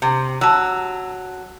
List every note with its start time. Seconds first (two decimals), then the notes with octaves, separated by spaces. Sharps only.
0.02 C3
0.41 F#3 A5 E6